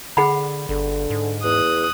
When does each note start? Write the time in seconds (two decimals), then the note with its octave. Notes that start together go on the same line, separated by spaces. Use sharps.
0.17 D3 G#4 F#5 B5
0.69 G1 D3
1.10 G#2
1.44 E2 D#6 F#6